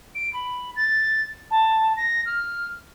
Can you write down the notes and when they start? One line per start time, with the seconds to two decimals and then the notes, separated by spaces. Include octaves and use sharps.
0.15 D7
0.33 B5
0.76 A6
1.51 A5
1.97 A#6
2.26 F6